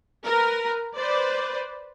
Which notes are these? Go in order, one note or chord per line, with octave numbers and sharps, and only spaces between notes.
A#4 B4
B4 C5 D5